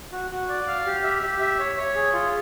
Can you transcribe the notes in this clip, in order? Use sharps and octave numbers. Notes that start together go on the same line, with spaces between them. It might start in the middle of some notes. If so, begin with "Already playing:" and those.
F#4
F#4
D5
F5
G4
E5
G4
E5
C#5
C#5
G#4
F4